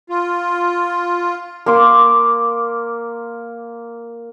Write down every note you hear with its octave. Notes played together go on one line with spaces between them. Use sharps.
F4
A#3 C6 D6